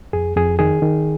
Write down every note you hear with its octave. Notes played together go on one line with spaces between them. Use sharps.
F2 G#4
F2 G#4
D#3 G#4
D#3